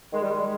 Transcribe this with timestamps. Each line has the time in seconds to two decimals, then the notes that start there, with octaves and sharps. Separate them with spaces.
0.13 D#3 G#3
0.21 G3
0.30 G#3